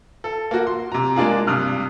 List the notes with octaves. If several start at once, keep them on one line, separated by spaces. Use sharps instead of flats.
A4
A#3 F#4
C6
C3 A#5
G#3 A#3 D4 F4 G#4
G2 C3 D#6 F6 F#6